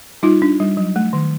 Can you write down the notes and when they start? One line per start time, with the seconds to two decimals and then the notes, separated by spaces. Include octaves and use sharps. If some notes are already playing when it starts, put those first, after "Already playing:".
0.23 G3 D#4 F4
0.42 D4
0.60 G3
0.77 F#3
0.96 A3
1.13 D#3